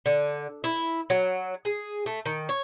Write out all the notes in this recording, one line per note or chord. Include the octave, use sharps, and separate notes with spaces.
D3
E4
F#3
G#4
A3
D#3
C#5